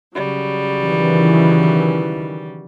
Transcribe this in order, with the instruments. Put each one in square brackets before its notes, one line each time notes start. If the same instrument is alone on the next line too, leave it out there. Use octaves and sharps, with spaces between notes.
[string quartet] C#3 F#3 G3
[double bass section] D#3 E3